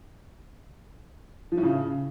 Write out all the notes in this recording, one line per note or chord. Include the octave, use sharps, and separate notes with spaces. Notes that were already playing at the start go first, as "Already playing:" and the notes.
F3
A2
C#3